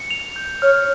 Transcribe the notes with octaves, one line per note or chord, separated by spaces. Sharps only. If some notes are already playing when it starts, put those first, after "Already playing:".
Already playing: C#7
F7
G6
C#5 F6